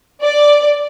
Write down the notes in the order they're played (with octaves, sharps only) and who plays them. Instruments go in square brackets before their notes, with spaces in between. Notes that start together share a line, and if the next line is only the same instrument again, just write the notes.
[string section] D5